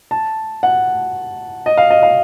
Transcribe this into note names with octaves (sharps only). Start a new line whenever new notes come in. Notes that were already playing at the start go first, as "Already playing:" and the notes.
A5
F#5
D#5
F5
D#5
F5